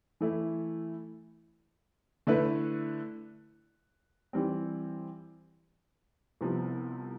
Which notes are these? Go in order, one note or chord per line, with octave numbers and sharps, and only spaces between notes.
E3 A3 E4
D3 A3 E4 B4
E3 G3 C4
C2 C3 F3 B3